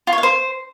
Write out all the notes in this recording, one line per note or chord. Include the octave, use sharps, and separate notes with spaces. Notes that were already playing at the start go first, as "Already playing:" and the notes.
F4
C#5
F5
C5